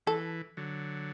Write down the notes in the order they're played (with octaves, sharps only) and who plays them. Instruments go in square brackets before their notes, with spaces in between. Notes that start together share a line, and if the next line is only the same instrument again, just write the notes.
[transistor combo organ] E3 [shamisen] A4
[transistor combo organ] D3 F#3